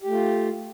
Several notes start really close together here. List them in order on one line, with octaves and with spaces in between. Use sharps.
G4 A3 F4